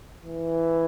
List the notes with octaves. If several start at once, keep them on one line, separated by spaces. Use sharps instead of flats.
E3